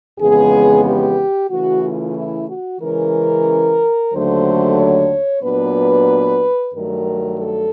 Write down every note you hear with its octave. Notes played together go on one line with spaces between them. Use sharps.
F2 C#3 E3 G#3 B3 G#4
G4
C#3 E3 A3 F#4
F4
E4
F#4
C#3 E3 G#3 C#4 A#4
D#2 D3 F#3 A3 C5
C#5
A#2 F#3 B3 D4 B4
G2 D#3 F#3 A3 A#4
A4